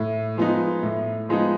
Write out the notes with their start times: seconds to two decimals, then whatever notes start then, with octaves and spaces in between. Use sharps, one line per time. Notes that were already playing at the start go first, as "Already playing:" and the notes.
Already playing: A2
0.37 F3 G#3 B3 D#4
0.83 A2
1.29 F3 G#3 B3 D#4